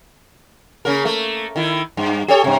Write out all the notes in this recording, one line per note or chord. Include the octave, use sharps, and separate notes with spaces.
C#3 A#3 A#4
A3 A#3
D#3 E4
G2
G4 A4 C#5
G2 C3